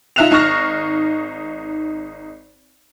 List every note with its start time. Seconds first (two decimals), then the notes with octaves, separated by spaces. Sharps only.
0.16 D#4 F4 E5 F#6 E7 F7
0.31 G#1 D#4 C#6 F6 A#6